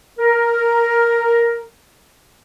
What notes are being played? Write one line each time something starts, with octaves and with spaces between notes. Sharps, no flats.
A#4